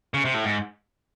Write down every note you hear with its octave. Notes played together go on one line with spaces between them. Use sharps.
C#3
C3
A2
G#2